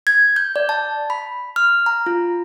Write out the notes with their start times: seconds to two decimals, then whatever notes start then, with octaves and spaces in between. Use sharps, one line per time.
0.07 G#6
0.36 G6
0.56 D5
0.69 A5
1.10 B5
1.56 F6
1.86 A#5
2.06 F4